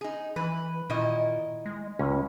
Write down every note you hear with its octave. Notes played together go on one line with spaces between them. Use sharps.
D#4 G#4
E3 B4
A#2 D#3 E4 D#5
G#3
C#2 C#4